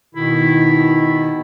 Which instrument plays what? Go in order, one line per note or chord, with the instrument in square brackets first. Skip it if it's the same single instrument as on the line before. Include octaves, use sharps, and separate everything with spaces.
[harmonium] B2 D#3 [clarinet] E4